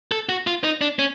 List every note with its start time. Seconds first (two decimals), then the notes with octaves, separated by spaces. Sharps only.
0.12 A4
0.29 F#4
0.47 F4
0.64 D#4
0.81 D4
0.99 C#4